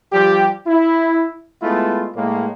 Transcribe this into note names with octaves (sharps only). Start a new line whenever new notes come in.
F3 G3 G4
E4
G#3 A3 B3 E4 F4
A2 G#3 A#3